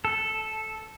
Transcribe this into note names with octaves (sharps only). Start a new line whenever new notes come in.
A4